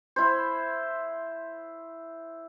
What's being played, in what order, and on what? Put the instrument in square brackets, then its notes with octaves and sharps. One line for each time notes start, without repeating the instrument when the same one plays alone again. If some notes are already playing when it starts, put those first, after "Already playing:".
[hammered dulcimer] E4 C5